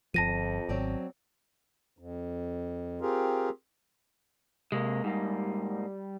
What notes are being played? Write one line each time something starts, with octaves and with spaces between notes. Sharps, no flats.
G1 F2 F3 A5 A#6 D#7
G#1 F#3 C4 D5
F2
C4 F4 G4 G#4 A#4
C3 G#3 A#3
G#2 G3 A#3